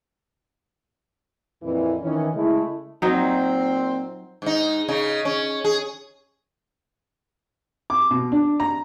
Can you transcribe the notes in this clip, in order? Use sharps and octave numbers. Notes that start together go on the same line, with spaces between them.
F2 A#2 E3
D#3 E3 C#4
C#3 G#3 A3 E4
A#2 F#3 C4 D#4
G#2 D#4
C#3 D#4
C#4
G#4
D6
B2
D4
A#5